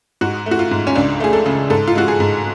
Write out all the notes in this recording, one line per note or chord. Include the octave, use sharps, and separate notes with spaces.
G#2 F#4
A3
F#4
F4
G#2
C#4
C#2 D4
A3 G#4
A4
C#3
G#2 A4
F4
G#3 F#4
G#4
G#2